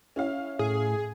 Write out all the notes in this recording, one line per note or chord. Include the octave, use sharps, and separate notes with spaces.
C#4 E4 F5
A2 G#4